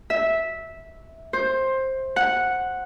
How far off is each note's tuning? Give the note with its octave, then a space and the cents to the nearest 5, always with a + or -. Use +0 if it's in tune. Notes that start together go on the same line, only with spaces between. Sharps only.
E5 -10
C5 +15
F#5 -5